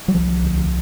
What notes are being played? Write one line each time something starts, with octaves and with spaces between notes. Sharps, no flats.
F#3
C2 F3
D2